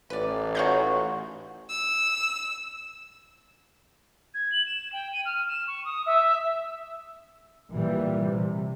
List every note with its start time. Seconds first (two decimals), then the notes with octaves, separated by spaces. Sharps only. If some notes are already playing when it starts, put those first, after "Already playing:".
0.10 A1 B4 D5
0.55 D#3 G#3 F#4 C#5 F5 G6
1.69 E6
4.34 G#6
4.52 F#7
4.66 E7
4.92 G5
5.13 D#7
5.26 F6
5.48 E7
5.67 C#6
5.85 D#6
6.06 E5
7.70 A#2 E3 G3
8.24 C3